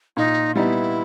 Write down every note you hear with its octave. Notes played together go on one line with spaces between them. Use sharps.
A#2 D#4
G3 B3 D#4 E4